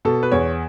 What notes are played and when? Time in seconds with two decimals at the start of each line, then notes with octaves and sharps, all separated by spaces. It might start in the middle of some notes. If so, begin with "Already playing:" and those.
0.05 B2 A4
0.23 B4
0.32 E2 C#5